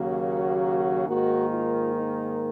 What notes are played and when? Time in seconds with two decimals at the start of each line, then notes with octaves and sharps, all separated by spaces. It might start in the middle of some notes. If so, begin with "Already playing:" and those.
Already playing: D#2 C#3 F#3 A#3 F#4
1.07 G#2 D#3 A#3 D#4 F#4
1.50 F4
1.93 D#4